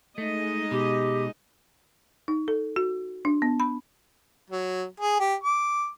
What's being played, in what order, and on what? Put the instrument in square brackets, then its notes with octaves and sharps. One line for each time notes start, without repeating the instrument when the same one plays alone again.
[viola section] G#3 D#4 D#5 [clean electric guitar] A3
[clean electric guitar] B2 [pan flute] G4
[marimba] D#4
A4
F#4
D4
B3
B5
[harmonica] F#3
G#4
G4
D6